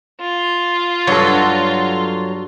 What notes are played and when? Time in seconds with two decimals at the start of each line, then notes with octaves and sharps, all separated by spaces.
0.21 F4
1.07 G2 F#3 A4